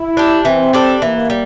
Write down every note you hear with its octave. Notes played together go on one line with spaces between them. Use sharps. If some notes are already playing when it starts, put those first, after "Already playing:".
Already playing: E4
D4 G4
E3 C4
G3 D4 A4
E3 A#3
G3